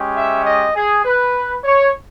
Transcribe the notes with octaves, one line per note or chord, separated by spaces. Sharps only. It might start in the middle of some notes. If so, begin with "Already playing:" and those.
Already playing: G#3 C#4 G4
E5
D#5
G#4
B4
C#5